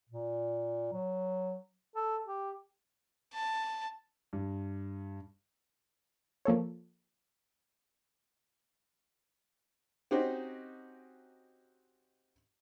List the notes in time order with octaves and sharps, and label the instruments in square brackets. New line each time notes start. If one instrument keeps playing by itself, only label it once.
[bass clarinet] A#2
F#3
A4
G4
[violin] A5
[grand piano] G2
[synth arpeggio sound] F3 A#3 A4 C#5
[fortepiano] C4 C#4 D#4 F#4 G4 C5